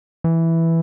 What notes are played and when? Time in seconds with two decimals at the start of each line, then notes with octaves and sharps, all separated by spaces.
0.24 E3